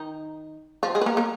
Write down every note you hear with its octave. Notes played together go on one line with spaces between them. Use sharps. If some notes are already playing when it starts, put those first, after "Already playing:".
Already playing: D#3 D#4
F3 F4
G#3 G#4
B4
A#3 A#4
A#3 A#4